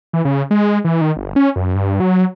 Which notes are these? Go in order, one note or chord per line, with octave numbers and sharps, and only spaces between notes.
E3
C#3
G#3
E3
D#3
G1
C#4
F#2
G2
F#3